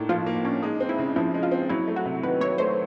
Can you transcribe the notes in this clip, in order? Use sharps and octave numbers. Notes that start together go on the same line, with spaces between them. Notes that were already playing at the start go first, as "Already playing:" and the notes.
Already playing: A2 A#3 D4 D#4
F3 F4
A#3
C#4 D4
G#3 D#4
C4
E4
C#3
F3 E4
G#3
F4
C4
F#3 E4
A3
F#4
C3
D#3 B4
F#3 C#5
A3 C5